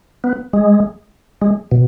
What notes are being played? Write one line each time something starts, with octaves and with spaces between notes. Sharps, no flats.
B3
G#3
G#3
B2